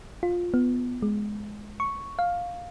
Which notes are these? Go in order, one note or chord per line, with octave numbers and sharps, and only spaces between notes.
F4
B3
G#3
C#6
F5